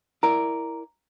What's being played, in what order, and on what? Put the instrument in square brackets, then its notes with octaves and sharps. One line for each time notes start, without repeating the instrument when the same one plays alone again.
[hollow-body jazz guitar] E4 A#4 D5 [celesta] A#5